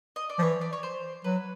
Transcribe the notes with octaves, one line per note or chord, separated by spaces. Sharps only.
D#5
D5
F3
E3 C#5
D5
C#5
C5
F#3 B4